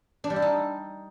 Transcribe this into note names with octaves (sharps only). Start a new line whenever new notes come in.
D4
G3
E4
D#4